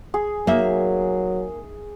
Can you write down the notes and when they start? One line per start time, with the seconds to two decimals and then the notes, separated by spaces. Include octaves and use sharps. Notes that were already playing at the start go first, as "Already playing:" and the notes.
0.14 G#4
0.47 F#3 A#3 D#4 E5